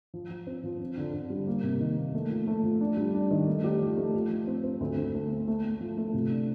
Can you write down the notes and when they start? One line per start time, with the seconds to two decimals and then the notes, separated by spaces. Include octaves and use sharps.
0.14 F3
0.30 F3
0.47 C4
0.64 F3
0.80 C4
0.97 D3
1.14 D3
1.30 G3
1.47 A#3
1.64 C3
1.80 D#3
1.97 A#3
2.14 A3
2.30 F3
2.47 A3
2.64 F3
2.81 D4
2.97 G3
3.14 D4
3.31 D#3
3.47 A3
3.64 G4
3.81 F3
3.97 A3
4.14 F3
4.31 F3
4.47 C4
4.64 C4
4.80 D2
4.97 D2
5.14 A3
5.31 A3
5.48 A3
5.64 A3
5.81 F3
5.97 A3
6.14 C3
6.31 D4